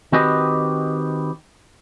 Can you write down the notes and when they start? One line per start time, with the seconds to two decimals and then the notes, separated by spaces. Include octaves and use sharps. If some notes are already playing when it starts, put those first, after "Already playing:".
0.12 D#3 C4 F#4 G4 B4 D#5